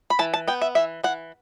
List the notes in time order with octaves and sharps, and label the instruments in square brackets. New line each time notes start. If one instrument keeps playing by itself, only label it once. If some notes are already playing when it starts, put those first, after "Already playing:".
[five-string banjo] B5
E3 A5
A5
B3 G5
E5
E3 E5
E3 F#5